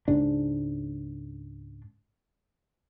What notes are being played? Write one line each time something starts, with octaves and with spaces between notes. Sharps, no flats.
C#2 G#2 D4